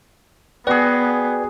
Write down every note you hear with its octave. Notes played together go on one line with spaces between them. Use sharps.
B3 F#4 G#4 B4 D5 G5